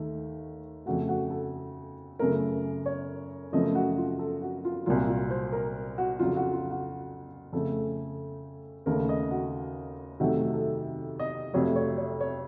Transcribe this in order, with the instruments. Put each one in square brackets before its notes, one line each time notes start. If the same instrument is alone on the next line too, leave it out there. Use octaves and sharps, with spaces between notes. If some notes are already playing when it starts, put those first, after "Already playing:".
Already playing: [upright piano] D#2 D#3 A3
F2 C#3 A3 F#4
F#4
A4
F#2 C#3 A3 A#4
C#5
F#2 C#3 F3 A3 D#5
F#4
F4
A4
F#4
F4
C2 A#2 F#3 F4
F4
C5
A#4
F#4
F2 C#3 F#3 F4
F#4
F4
F#4
F2 C#3 A3 A4
D#2 C#3 A3 A#4
D#5
F#4
F2 C3 D#3 F#3 A3 F#4
A4
D#5
F2 C3 F#3 A3 C#5
C#5
C#5
C#5